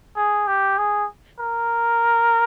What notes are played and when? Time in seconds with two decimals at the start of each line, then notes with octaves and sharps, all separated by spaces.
0.16 G#4
0.47 G4
0.78 G#4
1.39 A#4